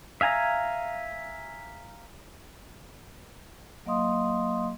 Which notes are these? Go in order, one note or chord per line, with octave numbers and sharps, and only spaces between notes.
E5 F5 G#5 A#5
F#3 A#3 D#5 F5 C6 D#6